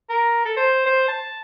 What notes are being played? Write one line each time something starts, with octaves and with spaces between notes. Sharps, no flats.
A#4
A4
C5
C5
A5